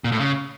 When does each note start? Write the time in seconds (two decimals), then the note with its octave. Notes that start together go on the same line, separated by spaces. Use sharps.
0.04 A#2
0.12 A2
0.19 C#3